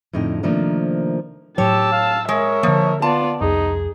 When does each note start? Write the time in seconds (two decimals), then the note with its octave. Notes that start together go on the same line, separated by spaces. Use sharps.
0.13 F2 A2 D3 D#4 G5
0.43 C3 D#3 F3 A3 A#3 D4
1.58 A2 F#3 G4 C#5 A5 E6
1.92 F5
2.29 G#3 A#4 C#5 E5
2.63 D3 F3 A#3
3.02 B3 F4 D5 A5
3.41 C2 F2 D#4 G#4